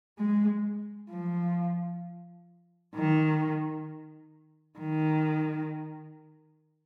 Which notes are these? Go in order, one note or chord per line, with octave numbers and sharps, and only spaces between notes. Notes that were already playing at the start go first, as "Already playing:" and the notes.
G#3
F3
D#3
D#3